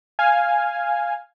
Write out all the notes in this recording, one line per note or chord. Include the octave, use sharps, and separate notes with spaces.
F5 G#5